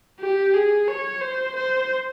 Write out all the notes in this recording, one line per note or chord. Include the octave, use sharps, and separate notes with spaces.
G4
G#4
C#5
C5
C5